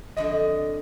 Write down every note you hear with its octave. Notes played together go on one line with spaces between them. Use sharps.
F2 D3 F3 D#5
D#5